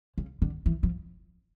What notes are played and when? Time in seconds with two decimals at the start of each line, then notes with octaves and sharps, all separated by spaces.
0.18 C#3
0.42 D3
0.66 E3
0.83 F3